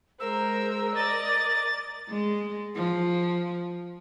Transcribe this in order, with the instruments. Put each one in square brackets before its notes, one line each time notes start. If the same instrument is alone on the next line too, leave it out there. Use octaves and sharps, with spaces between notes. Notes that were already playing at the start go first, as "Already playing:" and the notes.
[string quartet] G#3 A#4 C5 [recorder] E6
[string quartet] A#4 D5 D#5 [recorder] A6
[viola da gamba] G#3
F3